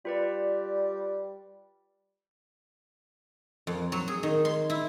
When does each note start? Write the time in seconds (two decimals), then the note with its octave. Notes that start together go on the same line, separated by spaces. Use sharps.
0.05 G3 F4 B4 D5
3.67 F2
3.92 F#3
4.08 G#4
4.23 D#3
4.45 C6
4.70 E4